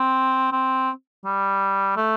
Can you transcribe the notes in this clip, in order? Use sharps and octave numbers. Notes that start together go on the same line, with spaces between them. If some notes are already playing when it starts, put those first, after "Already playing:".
Already playing: C4
C4
G3
A3